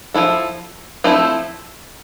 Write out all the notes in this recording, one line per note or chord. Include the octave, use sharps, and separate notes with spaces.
F3 A3 E4 A4
F3 A3 C4 E4